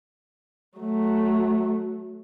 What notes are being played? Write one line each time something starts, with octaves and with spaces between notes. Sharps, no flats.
F#3 A3